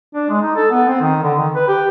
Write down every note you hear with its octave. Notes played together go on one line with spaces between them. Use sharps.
D4
G#3
D#4
A4
B3
C4
D#3
D3
D#3
B4
G4